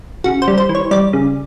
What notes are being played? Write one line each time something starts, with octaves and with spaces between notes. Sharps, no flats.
C#3 F#4
C5
G3
C5
E3
C#5
G3 D5
C#3